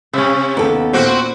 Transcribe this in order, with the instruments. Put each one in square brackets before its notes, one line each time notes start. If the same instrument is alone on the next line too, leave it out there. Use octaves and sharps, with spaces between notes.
[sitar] C3 [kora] C#4 E5
[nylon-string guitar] D#2 A4 [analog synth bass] B3
[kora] A#2 B4 [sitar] C4 F#4